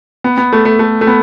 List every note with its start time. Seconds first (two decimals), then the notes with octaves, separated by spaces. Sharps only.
0.24 B3
0.38 B3
0.53 A3
0.65 A3
0.79 A3
1.01 A3
1.07 B3